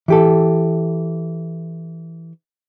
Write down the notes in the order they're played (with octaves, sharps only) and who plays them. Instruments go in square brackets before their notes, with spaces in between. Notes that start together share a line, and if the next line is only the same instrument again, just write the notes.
[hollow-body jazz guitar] E3 G4 A4